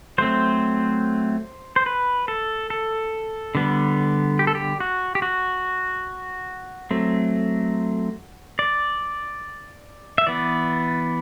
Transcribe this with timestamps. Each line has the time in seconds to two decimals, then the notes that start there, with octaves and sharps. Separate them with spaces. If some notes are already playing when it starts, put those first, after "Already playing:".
0.18 F#3 A3 C4 C5
1.76 C5
1.86 B4
2.28 A4
2.70 A4
3.55 D3 G3 B3
4.39 G4
4.47 A4
4.55 G4
4.80 F#4
5.15 G4
5.22 F#4
6.91 F#3 A3 C4
8.59 D5
10.18 E5
10.27 E3 B3 D5